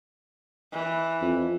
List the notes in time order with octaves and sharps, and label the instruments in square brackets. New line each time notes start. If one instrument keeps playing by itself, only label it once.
[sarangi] E3
[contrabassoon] F2